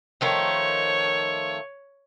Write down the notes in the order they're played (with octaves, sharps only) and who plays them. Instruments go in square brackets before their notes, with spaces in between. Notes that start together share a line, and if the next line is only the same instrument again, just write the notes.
[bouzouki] D#3 F3 A3 [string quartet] C#5